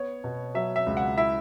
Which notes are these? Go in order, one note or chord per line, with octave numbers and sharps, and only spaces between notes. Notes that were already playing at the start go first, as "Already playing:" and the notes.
Already playing: B3 C#5
B2
F#3 E5
E5
C#2
F#5
E4 E5